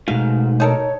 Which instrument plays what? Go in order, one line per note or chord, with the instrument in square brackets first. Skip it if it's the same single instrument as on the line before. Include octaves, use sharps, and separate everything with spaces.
[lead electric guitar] G#2 [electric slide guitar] B2 A3 F#4 [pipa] F5
[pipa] D#4 A4 A#4 [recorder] C#5